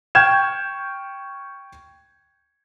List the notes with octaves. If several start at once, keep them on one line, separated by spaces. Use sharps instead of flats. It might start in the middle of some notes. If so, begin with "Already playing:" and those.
G5 C#6 F6 G6 G#6 E7